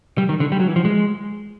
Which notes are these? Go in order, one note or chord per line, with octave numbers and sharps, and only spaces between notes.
G3
D#3
D3
G3
F#3
E3
F3
G#3